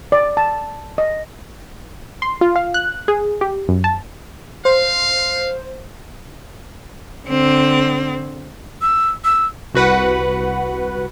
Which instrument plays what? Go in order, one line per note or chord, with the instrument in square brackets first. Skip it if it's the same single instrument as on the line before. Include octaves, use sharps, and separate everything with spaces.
[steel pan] D5
A5
D#5
[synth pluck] C6
F4
F5
F#6
G#4
G4
F#2
A5
[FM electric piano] C5 [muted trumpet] F5
[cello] D3 C4
[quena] E6
E6
[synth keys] C2 F#4 B4 F#5